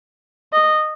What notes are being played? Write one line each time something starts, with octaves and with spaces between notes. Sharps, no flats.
D#5